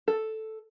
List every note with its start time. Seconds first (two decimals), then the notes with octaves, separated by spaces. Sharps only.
0.08 A4